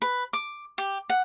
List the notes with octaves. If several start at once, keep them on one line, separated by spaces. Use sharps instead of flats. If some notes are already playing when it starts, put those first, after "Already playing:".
B4
D6
G4
F#5